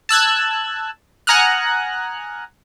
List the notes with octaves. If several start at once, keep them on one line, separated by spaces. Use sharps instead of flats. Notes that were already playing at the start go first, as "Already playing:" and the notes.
A5 E6 F#6 G#6
F#5 G#5 A#5 D#6 F6 F#6